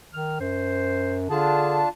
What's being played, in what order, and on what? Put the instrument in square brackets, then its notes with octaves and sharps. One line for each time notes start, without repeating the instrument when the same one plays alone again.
[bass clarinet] D#3 [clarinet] F6
[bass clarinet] F#2 [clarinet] C5
[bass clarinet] D3 [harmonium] D4 F4 A5 [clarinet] G#4